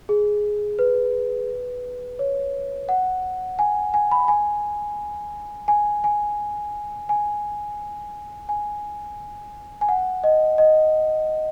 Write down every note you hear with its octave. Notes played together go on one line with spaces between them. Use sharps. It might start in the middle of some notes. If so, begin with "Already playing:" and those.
G#4
B4
C#5
F#5
G#5
G#5
B5
G#5
G#5
G#5
G#5
G#5
G#5
F#5
D#5
D#5